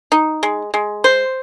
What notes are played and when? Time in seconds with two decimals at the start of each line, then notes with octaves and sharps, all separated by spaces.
0.12 D#4
0.43 G#3
0.74 G#3
1.04 C5